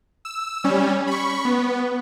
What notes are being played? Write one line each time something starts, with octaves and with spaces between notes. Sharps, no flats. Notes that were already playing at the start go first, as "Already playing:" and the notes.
E6
G3 C#4
B5 C#6
B3